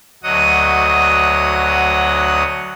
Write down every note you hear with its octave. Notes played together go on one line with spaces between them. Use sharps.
D2 F#3 D#5 F#5 D#6